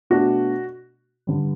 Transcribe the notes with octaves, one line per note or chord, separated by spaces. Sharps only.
B2 A3 D4 F#4
G2 D3 G3